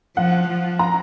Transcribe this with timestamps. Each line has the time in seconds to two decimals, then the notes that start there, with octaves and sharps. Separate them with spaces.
0.16 F3 F#5
0.49 F3
0.79 A#5